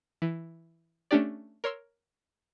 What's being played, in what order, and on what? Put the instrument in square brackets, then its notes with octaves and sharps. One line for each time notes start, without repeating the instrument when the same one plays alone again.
[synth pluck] E3
A3 C#4 D4 G4 D5
A#4 C#5 C6 E6